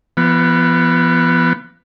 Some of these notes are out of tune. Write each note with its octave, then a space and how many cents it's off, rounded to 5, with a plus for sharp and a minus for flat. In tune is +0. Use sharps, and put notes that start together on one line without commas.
F3 -45 B3 +0